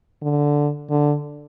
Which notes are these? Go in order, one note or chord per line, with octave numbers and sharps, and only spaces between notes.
D3
D3